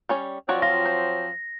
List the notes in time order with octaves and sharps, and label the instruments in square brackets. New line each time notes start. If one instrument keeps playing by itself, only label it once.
[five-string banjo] G3 C#4 C#5
[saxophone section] F3 F#3 C4 [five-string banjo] F#4 C#5 D5
[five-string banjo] F4 [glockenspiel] A#6
[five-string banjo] C5